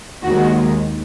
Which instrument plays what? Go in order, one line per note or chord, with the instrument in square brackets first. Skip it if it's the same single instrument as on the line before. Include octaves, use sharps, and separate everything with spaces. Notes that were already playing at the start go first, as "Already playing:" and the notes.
[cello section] D#2 D#3 G#3 F#4